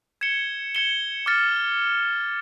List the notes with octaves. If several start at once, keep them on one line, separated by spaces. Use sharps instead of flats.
G#6 C#7 E7 G7
G#6 C#7 E7 G7
D6 F6 A6 C#7